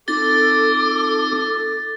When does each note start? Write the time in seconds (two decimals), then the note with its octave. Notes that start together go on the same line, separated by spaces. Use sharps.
0.08 C4 D#4 F4 A4 D6 A6